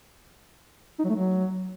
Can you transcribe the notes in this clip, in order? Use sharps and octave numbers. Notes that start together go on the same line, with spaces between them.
D#4
F#3
A3
F#3